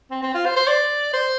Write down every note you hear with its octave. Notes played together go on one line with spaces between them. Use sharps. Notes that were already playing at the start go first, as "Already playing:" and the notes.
C4
C4
F4
C5
C5
D5
C5